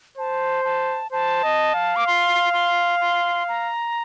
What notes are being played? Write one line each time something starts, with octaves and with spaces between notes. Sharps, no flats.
C5 A5
A5
C5 A5
D#5
F5
D6
C6
C6
C6
A#5